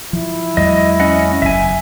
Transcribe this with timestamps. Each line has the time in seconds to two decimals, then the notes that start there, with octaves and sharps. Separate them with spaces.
0.13 F3 E4
0.57 E2 F#3 G#3 D#5
1.00 C#4 D#5 F#5
1.42 F#1 E2 E5 G#5